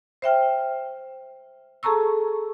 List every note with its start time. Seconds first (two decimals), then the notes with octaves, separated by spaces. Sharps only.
0.22 C5 E5 G5 F6
1.83 G#4 A4 A5 A#5 C#6 E6